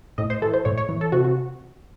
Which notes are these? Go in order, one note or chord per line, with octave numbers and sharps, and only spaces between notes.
A2 D#5
C5
E3 A4
C5
A2 C#5
C#5
E3
A4
C3 F#4
F#4